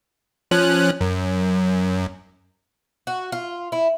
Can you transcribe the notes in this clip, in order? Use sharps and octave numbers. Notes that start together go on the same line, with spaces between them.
F3 C#4 F#6
F#2
F#4
F4
E4